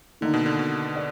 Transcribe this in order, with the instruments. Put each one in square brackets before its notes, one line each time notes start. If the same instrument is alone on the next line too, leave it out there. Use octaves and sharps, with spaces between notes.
[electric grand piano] D3 [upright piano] D#3 A#3 D#4
[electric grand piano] B2
D3
B2
[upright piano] D5